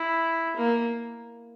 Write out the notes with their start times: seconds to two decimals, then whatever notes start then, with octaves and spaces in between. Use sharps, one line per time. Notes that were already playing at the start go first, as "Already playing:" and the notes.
Already playing: E4
0.56 A#3